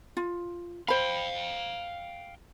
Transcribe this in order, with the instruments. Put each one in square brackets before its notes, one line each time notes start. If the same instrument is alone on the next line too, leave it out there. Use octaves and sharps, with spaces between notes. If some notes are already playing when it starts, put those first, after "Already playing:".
[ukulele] F4
[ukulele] C5 B5 [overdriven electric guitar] F5 G5